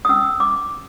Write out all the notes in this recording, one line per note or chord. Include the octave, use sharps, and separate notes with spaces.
D#6
C#4 E6
D6